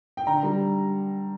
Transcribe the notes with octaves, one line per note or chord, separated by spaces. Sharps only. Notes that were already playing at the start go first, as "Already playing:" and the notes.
G5
D3 A#5
G3